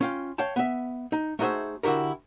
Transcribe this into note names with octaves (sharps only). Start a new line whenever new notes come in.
C#4 F4 G5
C#5 F5 G5 A5
B3 E5
D#4
A3 D#4 F#4 G#4 C5 E5
D3 E4 F#4 G4 A#4